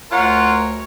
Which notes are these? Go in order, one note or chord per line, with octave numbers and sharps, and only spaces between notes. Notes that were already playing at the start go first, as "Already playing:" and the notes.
D2 F4 A#4 C#5 F#5